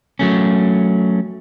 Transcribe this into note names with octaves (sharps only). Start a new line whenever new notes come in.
F#3 A3 C#4